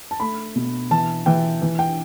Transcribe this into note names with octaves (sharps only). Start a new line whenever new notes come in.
A5
A3 B5
B2
E3 A5
E3 G5
E3
G5